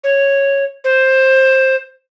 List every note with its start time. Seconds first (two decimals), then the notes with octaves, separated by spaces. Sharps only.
0.04 C#5
0.84 C5